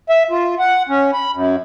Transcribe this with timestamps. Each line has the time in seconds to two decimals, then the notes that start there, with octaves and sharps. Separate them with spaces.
0.09 E5
0.31 F4
0.59 F#5
0.89 C#4
1.13 B5
1.33 F#2